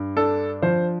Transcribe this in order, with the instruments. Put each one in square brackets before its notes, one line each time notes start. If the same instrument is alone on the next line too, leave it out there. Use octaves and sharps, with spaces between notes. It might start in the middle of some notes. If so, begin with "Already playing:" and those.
Already playing: [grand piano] G2
D4 A4
F3 C5